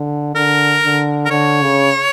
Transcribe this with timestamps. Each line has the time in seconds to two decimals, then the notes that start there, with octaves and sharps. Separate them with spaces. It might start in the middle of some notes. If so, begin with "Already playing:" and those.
Already playing: D3
0.35 D3 A#4
0.83 D3
1.25 A#4
1.30 D3 C#5
1.62 C#3